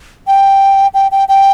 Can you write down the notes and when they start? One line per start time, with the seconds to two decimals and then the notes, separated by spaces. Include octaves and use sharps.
0.27 G5
0.94 G5
1.12 G5
1.29 G5